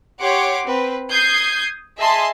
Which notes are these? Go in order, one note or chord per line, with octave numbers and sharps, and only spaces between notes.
G4 C#5 F#5 C6 D6
C4 B4
D#6 G6 G#6 C7
G#4 D#5 E5 G#5 A5 C6